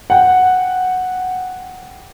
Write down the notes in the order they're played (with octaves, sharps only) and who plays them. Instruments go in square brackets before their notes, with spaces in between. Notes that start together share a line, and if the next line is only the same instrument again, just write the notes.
[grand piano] F#5 G5